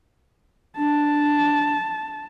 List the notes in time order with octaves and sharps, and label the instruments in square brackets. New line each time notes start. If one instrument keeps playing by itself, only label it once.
[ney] D4 [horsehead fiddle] A5